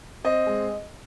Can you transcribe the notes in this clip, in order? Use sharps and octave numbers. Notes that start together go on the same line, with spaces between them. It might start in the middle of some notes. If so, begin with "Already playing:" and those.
C4 D#5
G#3